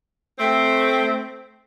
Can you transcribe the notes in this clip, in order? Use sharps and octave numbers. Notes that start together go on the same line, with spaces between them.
A3 C4